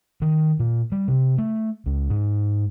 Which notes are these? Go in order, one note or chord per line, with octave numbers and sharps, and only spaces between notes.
D#3
A#2
G3
C3
A3
C#2
G#2